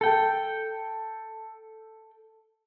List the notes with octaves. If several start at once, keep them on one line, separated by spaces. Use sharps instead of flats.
A4 G5